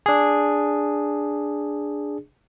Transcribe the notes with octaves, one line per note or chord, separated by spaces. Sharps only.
D4 G#4